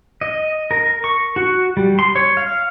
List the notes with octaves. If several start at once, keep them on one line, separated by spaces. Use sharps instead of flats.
D#5
A#4
C#6
F#4
G3
C6
C#5
F5